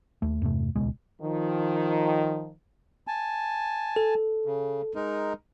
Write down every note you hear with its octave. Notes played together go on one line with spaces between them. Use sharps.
D#2 A3
E2 G2 C3 A3
D#1 C#2 B2 G#3
D#3 F3
G#5 A5
A4
C#3
G#3 D#4 A#4